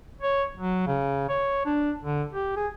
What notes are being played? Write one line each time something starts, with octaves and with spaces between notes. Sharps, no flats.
C#5
F#3
C#3
C#5
D4
D3
G4
G#4